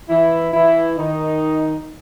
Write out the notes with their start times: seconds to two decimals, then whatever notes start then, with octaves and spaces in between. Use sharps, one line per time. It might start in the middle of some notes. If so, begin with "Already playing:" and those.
0.09 E3 E4
0.53 E3 E4
0.97 D#3 D#4